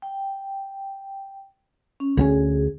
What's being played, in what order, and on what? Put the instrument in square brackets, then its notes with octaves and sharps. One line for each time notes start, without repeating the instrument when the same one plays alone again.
[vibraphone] G5
C#4
[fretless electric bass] D2 A#3 C#4 [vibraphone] G#4